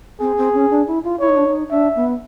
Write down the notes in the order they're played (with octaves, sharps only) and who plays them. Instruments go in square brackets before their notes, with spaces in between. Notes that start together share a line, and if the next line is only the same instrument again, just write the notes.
[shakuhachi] C4 [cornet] G#4
[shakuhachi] C4
C#4
D4
E4
F4
[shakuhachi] E4 [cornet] C#5
[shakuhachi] D#4
D4
D#4
[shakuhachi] D4 [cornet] E5
[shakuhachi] B3